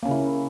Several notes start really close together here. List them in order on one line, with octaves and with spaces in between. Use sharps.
A#3 C#4 C#3 E4